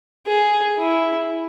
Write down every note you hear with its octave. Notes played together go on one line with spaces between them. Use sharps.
G#4
E4